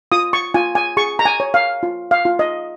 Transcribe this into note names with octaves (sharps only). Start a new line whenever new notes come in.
F4 D#6
C#6
F4 G#5
G#5
G#4 C#6
A#5
G#5
C#5
F5
F4
F5
F4
D#5